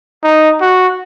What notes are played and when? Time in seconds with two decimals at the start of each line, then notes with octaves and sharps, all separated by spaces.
0.24 D#4
0.61 F#4